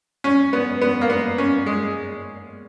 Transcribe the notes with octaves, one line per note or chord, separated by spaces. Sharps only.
C#4
B3
B3
A#3
B3
C#4
G#3